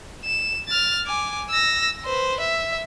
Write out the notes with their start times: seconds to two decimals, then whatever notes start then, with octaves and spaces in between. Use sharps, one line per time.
0.25 E7
0.68 F6 A6
1.06 G#5 D6
1.50 E6 A#6
2.04 B4 C5
2.40 E5